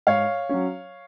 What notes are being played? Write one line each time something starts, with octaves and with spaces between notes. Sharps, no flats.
G#2 C#5 F5
F#3 C#4